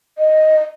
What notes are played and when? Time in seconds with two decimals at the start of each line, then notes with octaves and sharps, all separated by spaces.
0.18 D#5